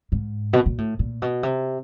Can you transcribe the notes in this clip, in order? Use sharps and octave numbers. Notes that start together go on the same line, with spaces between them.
G#2
B2
A#2
A2
A#2
B2
C3